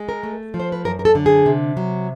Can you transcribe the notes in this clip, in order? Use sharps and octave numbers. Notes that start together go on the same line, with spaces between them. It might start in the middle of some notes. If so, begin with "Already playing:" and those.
Already playing: G#3
A#4
A3
F3
C5
B4
F#2 A#4
A#4
A4
D3
G#4
C3
F#3